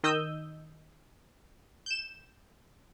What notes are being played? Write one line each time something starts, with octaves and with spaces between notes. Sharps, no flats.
D#3 D#5 E6 G6 D#7
G6 E7